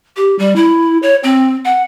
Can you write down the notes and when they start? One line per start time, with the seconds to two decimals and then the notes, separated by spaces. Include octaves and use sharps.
0.17 G4
0.39 G3
0.56 E4
1.03 C#5
1.23 C4
1.65 F#5